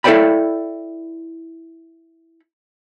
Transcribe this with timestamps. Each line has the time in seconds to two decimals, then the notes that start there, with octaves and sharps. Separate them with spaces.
0.04 E4 A4 A#4 D5 G5 B5